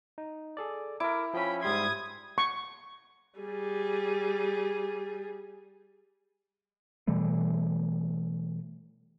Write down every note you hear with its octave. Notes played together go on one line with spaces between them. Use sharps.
D#4
G#4 A4 D5
E4 A#4 D6
F3 C#4 G5 B5
G#2 G3 C6 D#6 G#6
C#6
G3 G#4
B2 E3 G3 A3